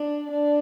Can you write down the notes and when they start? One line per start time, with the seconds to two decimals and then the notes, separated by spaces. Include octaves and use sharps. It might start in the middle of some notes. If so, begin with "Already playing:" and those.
Already playing: D4
0.31 D4